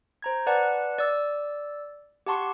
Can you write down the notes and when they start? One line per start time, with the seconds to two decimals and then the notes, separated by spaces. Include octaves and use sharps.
0.22 C5 A#5 G#6
0.47 B4 D5 F#5 A5
0.99 D5 E6 A6
2.26 G4 F#5 A5 C6 C#6